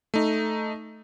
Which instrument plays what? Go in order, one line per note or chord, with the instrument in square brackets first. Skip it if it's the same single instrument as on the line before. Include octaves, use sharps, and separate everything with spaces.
[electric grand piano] A3 D#4